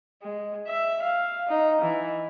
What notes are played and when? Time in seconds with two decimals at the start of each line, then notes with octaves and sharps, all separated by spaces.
0.22 G#3
0.67 E5
1.02 F5
1.49 D#4
1.82 E3